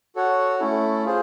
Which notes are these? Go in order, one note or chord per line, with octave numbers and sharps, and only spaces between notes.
F#4 A4 C#5 F#5
A3 C#4 E4 A4
F4 G#4 C5